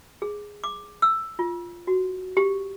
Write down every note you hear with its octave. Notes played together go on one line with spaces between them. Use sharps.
G#4
D6
E6
F4
F#4
G4